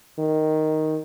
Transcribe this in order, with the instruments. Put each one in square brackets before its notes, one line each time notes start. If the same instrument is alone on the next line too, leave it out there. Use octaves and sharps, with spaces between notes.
[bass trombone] D#3